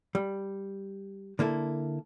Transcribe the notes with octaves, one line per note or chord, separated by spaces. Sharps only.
G3
D3 A#3 E4 A4